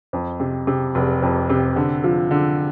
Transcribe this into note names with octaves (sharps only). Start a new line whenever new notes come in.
F2
C3
C3
F1
F2
C3
D3
F3
D3